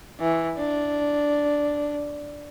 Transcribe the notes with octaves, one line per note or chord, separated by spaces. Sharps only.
E3
D4